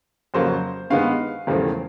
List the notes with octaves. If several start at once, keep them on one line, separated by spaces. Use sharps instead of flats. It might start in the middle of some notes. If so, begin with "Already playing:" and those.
F2 C#3 F#3 A#3 C5
G2 D#3 G#3 B3 F5
E1 E2 C#3 F3 A3